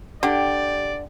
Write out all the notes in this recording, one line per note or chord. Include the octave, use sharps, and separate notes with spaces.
D3 G4 D5